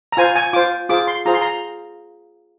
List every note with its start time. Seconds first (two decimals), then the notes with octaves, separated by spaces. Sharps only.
0.12 A#5
0.17 F4 C5 G#5
0.36 G#5
0.53 F4 C5 D6
0.89 F4 G#4 C5 D6
1.07 C6
1.26 F4 G#4 C5 A#5
1.34 C6
1.42 A#5